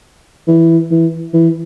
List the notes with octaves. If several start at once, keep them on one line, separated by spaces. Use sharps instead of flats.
E3
E3
E3